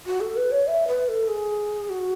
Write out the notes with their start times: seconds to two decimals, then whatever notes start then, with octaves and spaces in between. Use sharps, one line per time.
0.07 F#4
0.21 A4
0.36 B4
0.52 C#5
0.67 E5
0.88 B4
1.09 A4
1.28 G#4
1.90 F#4